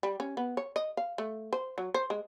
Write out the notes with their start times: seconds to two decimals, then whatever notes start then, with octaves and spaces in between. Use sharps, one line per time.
0.03 G3
0.20 C#4
0.37 B3
0.57 C#5
0.76 D#5
0.97 F5
1.18 A3
1.53 C5
1.78 F#3
1.94 C5
2.10 G#3